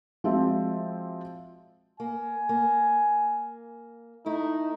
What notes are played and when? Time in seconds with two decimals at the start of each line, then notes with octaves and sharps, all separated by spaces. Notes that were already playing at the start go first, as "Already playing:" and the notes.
0.24 F3 G#3 C4 F#4 E5
2.00 A#3 G#5
2.49 A#3
4.26 A3 D#4 E4